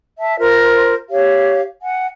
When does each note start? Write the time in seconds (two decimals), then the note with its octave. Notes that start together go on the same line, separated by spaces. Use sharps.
0.19 E5 A5
0.39 F4 A#4 C5
1.11 G4 C#5 F5
1.82 F#5 G#5